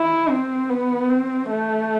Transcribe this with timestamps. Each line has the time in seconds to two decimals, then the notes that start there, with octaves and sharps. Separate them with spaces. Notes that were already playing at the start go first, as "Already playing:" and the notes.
Already playing: E4
0.30 C4
0.70 B3
1.09 C4
1.50 A3